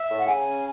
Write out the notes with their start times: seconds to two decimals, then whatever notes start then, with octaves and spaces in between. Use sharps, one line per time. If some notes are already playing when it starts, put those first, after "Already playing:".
Already playing: E5
0.10 A2
0.18 F#5
0.27 C#3 G#5
0.45 C#4